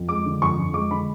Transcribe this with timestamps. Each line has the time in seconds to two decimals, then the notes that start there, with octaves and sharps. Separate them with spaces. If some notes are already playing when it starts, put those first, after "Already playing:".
Already playing: F2
0.09 G#3 D6
0.25 D3
0.42 F2 C#6
0.58 F2
0.74 G#3 D6
0.91 D3 B5